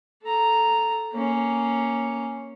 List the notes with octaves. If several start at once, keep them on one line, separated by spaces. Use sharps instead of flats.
A4 A#5
A#3 C#4